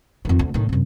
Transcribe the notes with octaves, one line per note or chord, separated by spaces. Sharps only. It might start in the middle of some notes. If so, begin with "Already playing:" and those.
F2 D#3
D2
A2 D#3
F#2 C3